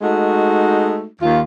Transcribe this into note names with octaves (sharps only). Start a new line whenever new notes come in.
G#3 A3 D#4 F#4
D#2 F4